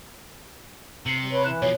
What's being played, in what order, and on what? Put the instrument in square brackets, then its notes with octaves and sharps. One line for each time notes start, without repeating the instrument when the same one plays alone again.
[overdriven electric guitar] C3 [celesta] C7 C#7 F#7
[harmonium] G3
B4 C#5
[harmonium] E3 E4 [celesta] F#6 E7
[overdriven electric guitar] B2 F3 [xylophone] C#5